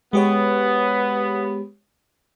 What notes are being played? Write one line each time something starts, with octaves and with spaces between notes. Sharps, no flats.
G#3 B3 G4 C#5